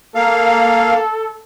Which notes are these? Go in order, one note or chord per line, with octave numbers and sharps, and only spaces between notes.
A#3 A4 F5